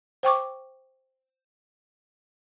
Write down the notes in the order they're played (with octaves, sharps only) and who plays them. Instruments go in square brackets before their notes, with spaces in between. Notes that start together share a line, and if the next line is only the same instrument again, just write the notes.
[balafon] C5 G5 C#6 D6